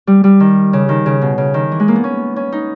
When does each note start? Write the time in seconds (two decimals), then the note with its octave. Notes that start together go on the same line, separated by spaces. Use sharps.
0.07 G3
0.24 G3
0.40 D#3
0.73 C#3
0.89 D#3
1.06 C#3
1.21 B2
1.38 C#3
1.54 D#3
1.72 E3
1.80 G#3
1.88 A#3
1.96 B3
2.04 C#4
2.36 C#4
2.52 D#4